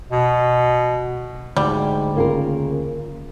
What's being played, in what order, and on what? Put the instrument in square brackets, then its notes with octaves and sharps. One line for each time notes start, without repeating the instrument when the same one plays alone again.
[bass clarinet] B2
[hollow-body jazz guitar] D2 [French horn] G#2 [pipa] G3
[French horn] C#3 [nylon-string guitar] A#3 F4 A#4